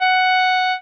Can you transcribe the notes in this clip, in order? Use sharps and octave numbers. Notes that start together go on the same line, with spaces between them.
F#5